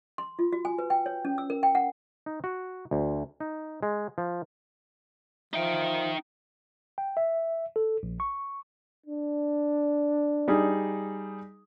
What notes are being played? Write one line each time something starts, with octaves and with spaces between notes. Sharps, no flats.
C6
F4
F#4
G#5
B4
G5
C#5
C#4
E6
A#4
G5
F#5
D#4
F#4
D2
D#4
G#3
F3
F3 D#4 E5 G5
G5
E5
A4
A#1
C#6
D4
G3 D#4 G#4